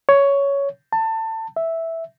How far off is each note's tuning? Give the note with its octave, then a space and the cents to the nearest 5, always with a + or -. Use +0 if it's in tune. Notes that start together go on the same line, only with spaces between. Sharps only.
C#5 +10
A5 +25
E5 -5